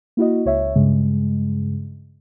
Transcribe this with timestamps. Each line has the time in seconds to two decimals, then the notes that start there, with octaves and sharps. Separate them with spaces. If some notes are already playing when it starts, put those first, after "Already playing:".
0.17 A#3 E4 F#4 D#5
0.45 C#2 C#5 E5
0.76 G2 C#3 G#3